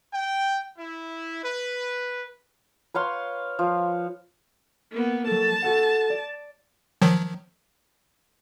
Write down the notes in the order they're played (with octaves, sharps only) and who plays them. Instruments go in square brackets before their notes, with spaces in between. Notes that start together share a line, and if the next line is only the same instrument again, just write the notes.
[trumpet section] G5
E4
B4
[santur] B4 C#5 F5 C6
F3
[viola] A#3 B3
[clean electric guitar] F#3 A4 [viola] A5
[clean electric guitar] F#4 A4 F#5
D5
[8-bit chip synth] D#3 F3 F#3